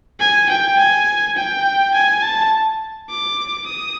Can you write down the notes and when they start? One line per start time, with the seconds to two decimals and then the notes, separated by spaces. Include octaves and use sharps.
0.20 G#5
0.50 G5
0.78 G#5
1.37 G5
1.94 G#5
2.22 A5
3.10 D6
3.67 D#6